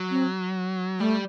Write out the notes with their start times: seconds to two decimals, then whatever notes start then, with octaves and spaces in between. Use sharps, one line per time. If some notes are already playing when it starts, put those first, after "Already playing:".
Already playing: F#3
0.11 C4
0.99 G3 A3